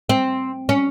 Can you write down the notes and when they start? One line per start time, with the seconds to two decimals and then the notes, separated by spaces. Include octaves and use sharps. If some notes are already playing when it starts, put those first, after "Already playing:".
0.09 C4
0.69 C#4